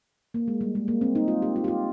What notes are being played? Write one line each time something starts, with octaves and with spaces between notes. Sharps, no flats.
A#3
G#3
G3
G#3
A#3
C4
D#4
F4
G4
F4
G4
F4